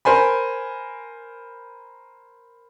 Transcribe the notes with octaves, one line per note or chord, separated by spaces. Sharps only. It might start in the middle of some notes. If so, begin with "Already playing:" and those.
A#4 C5 G#5 B5